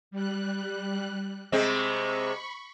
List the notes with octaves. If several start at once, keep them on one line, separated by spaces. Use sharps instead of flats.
G3 F#6
C3 G#3 C4 B5 C#6